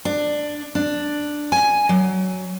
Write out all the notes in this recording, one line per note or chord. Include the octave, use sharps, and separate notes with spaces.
D4
D4
G#5
F#3